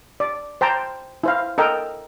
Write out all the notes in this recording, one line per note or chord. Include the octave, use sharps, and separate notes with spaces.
D5
C5 G5 A5 A#5
E4 C5 F5
A4 A#4 D#5 G5